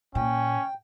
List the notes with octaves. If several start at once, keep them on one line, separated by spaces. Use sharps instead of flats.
A#2 C#4 G5